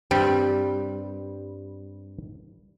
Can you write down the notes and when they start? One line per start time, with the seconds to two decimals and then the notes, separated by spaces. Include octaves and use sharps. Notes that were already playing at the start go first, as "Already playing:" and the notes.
0.11 G2 G3 C4